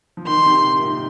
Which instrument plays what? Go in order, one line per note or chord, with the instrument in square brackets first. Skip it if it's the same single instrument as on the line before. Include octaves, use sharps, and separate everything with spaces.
[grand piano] F3
[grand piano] D#3 [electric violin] C6
[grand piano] C3
C3
A#2
G#2